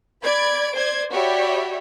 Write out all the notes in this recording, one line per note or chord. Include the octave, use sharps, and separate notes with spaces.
D5 B5 G#6 D7
C5 D5 G#6
F#4 G4 C#5 D5 E5 B5